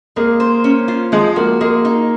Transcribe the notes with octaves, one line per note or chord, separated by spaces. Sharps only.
G#3 A#3
C5
C#4
F4
F3 G#3
A#3 F#4
G#3 A#3
D#4